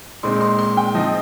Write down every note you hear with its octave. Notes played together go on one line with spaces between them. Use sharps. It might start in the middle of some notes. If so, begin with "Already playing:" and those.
A#2 G#3 C4 D#4 C6
C6
C6
G5
F3 C4 D#4 D#5